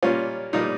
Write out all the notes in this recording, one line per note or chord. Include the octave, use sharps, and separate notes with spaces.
A#2 G3 A#3 C#4 F4
A#2 G3 A#3 D#4